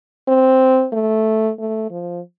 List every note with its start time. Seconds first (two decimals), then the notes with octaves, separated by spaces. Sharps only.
0.28 C4
0.93 A3
1.59 A3
1.91 F3